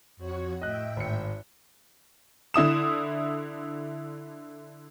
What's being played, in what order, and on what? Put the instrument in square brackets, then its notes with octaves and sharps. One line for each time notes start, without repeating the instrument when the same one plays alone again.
[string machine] F2 F#4 C#5
[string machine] A2 E5 G5 [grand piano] D#5 F#6
[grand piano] G#1 C#7
[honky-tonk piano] D3 E4 D#6 E7